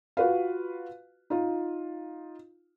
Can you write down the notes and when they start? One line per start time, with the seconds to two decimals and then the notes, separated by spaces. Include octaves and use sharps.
0.17 F4 F#4 B4 F5
1.30 D#4 F4